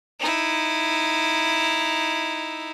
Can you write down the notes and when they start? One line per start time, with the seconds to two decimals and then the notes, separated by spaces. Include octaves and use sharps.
0.20 D#4 E4